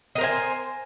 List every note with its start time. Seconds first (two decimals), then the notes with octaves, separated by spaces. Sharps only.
0.15 D#5
0.18 A#4
0.21 C5
0.24 G#5